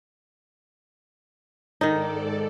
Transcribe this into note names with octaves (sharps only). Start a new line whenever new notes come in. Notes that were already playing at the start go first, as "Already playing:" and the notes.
G#2 D#3 D#4 A4 D5